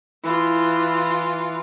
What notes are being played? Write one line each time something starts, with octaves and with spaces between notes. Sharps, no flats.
E3 F4